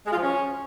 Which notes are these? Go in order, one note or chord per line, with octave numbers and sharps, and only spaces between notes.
G#3
F4
F3
C#4